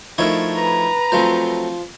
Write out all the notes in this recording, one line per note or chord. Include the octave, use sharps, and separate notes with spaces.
F3 A3 D#4 E4 A#4 C#5
B4 A#5
F3 F#3 A3 C4 C5